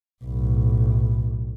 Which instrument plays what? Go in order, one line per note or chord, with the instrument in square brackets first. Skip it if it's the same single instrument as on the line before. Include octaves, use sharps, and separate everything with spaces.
[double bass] B1 A2